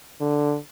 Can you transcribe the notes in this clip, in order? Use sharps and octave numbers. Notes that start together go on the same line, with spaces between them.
D3